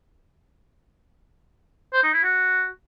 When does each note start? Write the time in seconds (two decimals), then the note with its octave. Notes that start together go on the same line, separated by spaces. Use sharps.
1.93 C5
2.03 D#4
2.13 E4
2.24 F#4